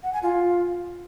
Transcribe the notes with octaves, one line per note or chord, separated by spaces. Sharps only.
F#5
G#5
F4